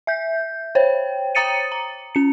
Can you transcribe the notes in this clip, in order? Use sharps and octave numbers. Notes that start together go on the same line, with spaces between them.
E5 G6
C5 C#5 G5
G5 A#5 D#6 A6 C#7 D#7
A#5
C#4 C#7